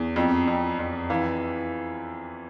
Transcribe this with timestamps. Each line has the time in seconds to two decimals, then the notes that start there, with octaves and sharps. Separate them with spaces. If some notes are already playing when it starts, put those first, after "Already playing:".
Already playing: E2
0.16 F2
0.48 F2
0.79 F2
1.10 E3 F5